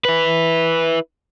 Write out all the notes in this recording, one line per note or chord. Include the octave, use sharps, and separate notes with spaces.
E4 B4